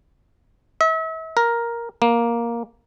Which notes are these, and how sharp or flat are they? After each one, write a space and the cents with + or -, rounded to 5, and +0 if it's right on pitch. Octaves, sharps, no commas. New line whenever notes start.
E5 -40
A#4 +5
A#3 +5